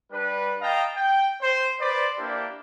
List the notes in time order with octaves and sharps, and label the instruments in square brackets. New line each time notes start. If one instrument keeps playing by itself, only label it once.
[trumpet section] G3 D4 B4
D#5 F5 G5 A5 A#5
G5
C5
B4 C5 D5
A#3 D4 E4 G4